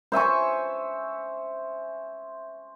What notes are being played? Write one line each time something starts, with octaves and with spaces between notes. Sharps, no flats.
C5 E5 G#5 C#6